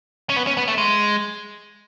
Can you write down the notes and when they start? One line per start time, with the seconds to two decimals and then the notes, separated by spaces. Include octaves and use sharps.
0.29 C#4
0.36 B3
0.47 C#4
0.57 B3
0.68 A3
0.78 G#3